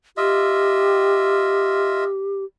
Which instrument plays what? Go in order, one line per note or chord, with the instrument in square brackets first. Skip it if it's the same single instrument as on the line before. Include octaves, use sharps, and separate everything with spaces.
[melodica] F4 D#5 E5 [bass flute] G4